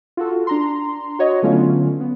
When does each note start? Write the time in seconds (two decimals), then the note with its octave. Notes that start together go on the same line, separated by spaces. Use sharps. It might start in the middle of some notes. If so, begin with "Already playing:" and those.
0.17 F4 F#4 A4
0.47 D4 A#5 C6
1.19 F#4 C#5 D#5
1.42 D3 F#3 A3 B3 C#4 F4
2.00 B3